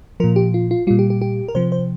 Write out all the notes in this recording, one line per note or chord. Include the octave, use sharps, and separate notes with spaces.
A#2 F3 A#4
G4
F4
F4
A#2 G3 F4
G4
G4
G4
A#4
C3 F3 C5
C5